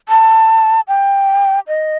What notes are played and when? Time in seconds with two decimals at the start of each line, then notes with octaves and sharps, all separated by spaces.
0.09 A5
0.88 G5
1.68 D#5